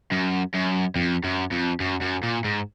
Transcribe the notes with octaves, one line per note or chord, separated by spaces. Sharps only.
F#2
F#2
F2
F#2
F2
F#2
F#2
A#2
G#2